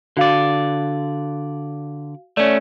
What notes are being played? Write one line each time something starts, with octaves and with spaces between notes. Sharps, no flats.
D3 F#4 D5 F5
A3 C#4 C#5 D5